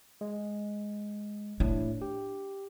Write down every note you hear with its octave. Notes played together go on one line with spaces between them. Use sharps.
G#3
A2 D4
G4